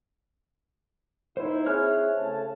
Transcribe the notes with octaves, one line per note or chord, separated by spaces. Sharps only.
A#2 D#4 E4 C5
C4 E4 G#4 C#5 F6 F#6
C#3 A3 A5